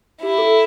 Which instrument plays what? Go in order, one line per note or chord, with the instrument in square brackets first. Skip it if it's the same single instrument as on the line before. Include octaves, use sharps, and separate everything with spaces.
[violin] E4 [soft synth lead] G4
[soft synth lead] A4